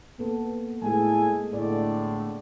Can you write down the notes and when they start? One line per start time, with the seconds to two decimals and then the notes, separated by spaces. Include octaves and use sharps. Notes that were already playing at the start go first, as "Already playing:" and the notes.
0.18 A#3 B3 A4
0.82 A2 G#3 G#4 A4 G#5
1.53 A2 D3 D5